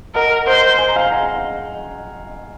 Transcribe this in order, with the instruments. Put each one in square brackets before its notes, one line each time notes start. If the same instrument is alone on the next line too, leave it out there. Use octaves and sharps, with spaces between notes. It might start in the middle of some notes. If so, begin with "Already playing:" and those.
[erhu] A#4 [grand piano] D#5 F#5
[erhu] C5 [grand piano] D#5 F#5
[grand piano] G#5
A#5
F5 G#5
F#5 A#5